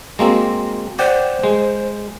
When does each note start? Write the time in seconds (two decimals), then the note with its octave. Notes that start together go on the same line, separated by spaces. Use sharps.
0.19 G#3 A#3 C4 F#4
0.99 C5 D5 F#5 G5
1.44 G#3